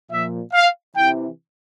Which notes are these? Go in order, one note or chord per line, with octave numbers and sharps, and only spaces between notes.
A#2 F3 E5
F5
C3 E3 G5